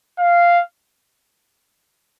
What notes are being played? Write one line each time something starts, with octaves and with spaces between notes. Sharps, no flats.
F5